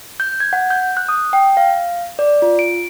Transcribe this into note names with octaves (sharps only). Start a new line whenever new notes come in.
G6
G#6
F#5
G6
F#6
D#6
G5
F5
D5
F4
D7